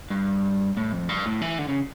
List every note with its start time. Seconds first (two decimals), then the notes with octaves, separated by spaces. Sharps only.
0.10 G2
0.77 A2
0.93 F2
1.09 G2
1.26 A2
1.41 E3
1.59 D3
1.69 C#3